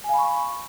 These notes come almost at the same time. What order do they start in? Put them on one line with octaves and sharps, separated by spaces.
G#5 F5 B5 C#6